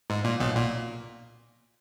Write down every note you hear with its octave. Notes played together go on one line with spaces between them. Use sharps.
G#2
A#2
B1 B2
A#2